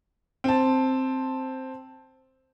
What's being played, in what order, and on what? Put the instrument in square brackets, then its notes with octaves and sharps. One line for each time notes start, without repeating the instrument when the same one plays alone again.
[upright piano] C4 A5